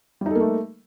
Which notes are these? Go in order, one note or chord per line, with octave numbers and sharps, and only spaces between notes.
G3 A3 A#3 D#4 A4